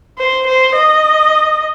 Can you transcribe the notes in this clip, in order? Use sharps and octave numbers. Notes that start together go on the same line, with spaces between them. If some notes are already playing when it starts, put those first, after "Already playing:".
C5
C5
D#5